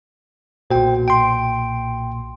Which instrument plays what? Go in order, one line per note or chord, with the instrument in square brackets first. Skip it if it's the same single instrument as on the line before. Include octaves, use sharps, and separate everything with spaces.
[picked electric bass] B1 A#2 [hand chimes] F#4 [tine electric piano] C5 G5
[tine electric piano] G5 C6 [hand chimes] D7